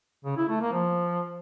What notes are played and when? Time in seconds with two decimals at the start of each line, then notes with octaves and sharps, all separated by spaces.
0.25 C#3
0.37 E4
0.49 A3
0.61 A#3
0.73 F3